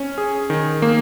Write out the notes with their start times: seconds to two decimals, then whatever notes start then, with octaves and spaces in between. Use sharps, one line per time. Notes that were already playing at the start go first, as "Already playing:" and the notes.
Already playing: C#4
0.18 G#4
0.50 D#3
0.82 A#3